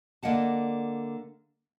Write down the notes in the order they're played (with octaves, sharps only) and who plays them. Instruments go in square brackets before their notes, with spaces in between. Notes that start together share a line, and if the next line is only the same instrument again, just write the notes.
[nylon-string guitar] D3 A#3 D#5 F#5 A5